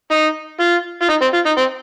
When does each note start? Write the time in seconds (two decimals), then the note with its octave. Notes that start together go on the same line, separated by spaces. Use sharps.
0.11 D#4
0.60 F4
1.02 F4
1.09 D#4
1.22 C4
1.34 F4
1.46 D#4
1.58 C4